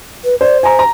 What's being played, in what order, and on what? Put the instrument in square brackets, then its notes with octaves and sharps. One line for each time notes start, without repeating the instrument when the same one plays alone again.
[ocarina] B4
[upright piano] C5 [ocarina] D5
[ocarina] C5 [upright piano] G#5 A#5
[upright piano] A#5